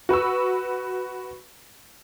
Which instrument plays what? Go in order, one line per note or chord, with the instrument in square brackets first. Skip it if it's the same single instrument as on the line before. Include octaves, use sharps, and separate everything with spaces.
[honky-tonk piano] F#4 B4 C#6 E6